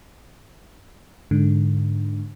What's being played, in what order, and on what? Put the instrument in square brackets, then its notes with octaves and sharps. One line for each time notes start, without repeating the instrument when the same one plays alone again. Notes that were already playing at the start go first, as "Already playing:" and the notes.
[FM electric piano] G#2 D3